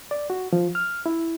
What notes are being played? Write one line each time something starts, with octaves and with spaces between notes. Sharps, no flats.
D5
F#4
F3
F6
E4